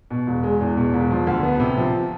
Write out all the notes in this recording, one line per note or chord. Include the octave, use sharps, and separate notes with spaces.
B2
E1
G#3
E2
B2
E1
F3
D2
B3
C3
F3